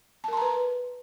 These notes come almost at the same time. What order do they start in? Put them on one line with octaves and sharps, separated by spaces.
A5 A#4 C6 A#5 B4